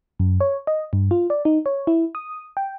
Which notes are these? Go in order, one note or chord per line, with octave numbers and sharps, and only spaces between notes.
F#2
C#5
D#5
G2
F4
D5
D#4
C#5
E4
D#6
G5